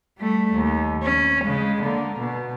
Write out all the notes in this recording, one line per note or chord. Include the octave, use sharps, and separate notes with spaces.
G3 A3
D#2
C#4
C#3 G#3
D3 A#3
B2